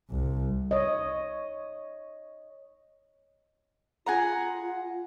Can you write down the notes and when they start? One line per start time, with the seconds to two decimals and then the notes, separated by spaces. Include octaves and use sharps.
0.10 C2
0.71 C#5 D#5
4.06 F4 G#4 F#5 A#5